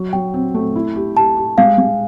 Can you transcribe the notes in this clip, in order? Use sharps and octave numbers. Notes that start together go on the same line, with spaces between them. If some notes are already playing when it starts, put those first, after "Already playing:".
Already playing: F#3
F#3 G5
C4
A3
E4
G4
G4 A5
G4
G#3 F5
G#3